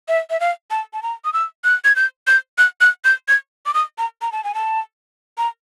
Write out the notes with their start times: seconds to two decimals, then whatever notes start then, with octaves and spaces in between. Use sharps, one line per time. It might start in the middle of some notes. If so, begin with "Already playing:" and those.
0.08 E5
0.30 E5
0.40 F5
0.71 A5
0.93 A5
1.03 A#5
1.25 D#6
1.33 E6
1.64 F#6
1.84 G#6
1.96 G6
2.27 G6
2.58 F#6
2.81 F#6
3.05 G6
3.28 G#6
3.66 D6
3.74 D#6
3.98 A#5
4.22 A#5
4.32 A5
4.44 G#5
4.55 A5
5.38 A#5